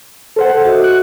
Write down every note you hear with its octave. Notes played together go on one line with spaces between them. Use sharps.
A4 C5 F#5
F#4 D#5 E5
F#6